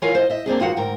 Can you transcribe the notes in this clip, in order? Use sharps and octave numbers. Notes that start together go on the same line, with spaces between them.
E3 F4 A#4 C#5 F5 G#5
C5 D#5
D#5 E5
A#3 C4 D4 G#4
G2 D#3 F4 F#4 F5 F#5
D2 G#2 A#4 G5